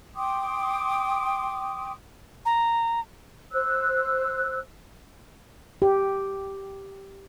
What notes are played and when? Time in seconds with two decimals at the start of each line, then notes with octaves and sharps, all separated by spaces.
0.15 G5 C6 D6 D#6
2.45 A#5
3.51 C5 E6 F#6
5.82 G4